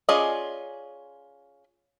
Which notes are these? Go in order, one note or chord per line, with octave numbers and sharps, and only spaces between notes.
C#4 F4 G#4 D5 D#5